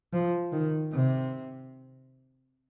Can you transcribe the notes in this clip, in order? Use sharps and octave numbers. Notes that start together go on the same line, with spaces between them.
F3
D#3
C3